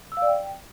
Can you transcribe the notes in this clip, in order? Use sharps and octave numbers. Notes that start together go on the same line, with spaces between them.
E6
F5
D5
G5